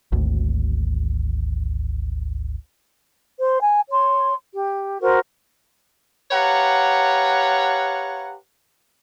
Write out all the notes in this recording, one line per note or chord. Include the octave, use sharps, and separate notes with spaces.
G#1 D2
C5
G#5
C#5 C6
G4
F#4 A#4 C5
G4 B4 C#5 F5 F#5 A#5